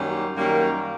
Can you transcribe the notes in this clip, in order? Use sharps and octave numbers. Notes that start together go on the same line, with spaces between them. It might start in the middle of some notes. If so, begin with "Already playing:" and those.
Already playing: F#2 D#3 G3 A#3 C#4
F#2 D#3 G3 A#3 C#4